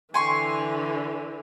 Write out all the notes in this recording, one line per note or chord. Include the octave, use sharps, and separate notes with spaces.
D3 E3 G#5 C6 C#6